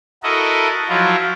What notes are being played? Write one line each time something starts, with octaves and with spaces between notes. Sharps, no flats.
E4 F#4 A4 A#4 D#5
F3 F#3 E4 F4